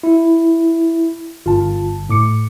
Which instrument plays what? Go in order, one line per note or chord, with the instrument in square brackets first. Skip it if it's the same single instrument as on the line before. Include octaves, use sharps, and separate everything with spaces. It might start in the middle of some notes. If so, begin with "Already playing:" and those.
[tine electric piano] E4
[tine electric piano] G1 [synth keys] F4 A5
[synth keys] A2 D6 C#7